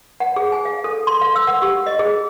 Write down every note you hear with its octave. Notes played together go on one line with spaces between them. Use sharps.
F#5
G#4
G#5
F5
A4
C6
F5
E6
F#5
G4
D#5
G#4